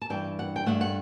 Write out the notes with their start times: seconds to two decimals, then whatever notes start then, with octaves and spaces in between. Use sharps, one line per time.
0.02 A5
0.10 G2 E3 G3 G5
0.39 F#5
0.56 G5
0.66 G2 F#3 A3 F#5
0.81 F#5